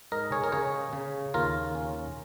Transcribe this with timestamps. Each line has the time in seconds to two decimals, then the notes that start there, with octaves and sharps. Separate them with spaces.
0.12 G#2 A#4 D#5
0.32 G#4 C#5
0.44 A#4
0.52 C#3 G#4 C#5
0.93 C#3
1.34 D#2 F4 A#4
1.75 C#4